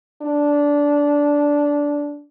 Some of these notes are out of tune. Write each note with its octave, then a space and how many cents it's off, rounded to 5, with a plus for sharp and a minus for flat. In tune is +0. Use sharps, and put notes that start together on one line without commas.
D4 -15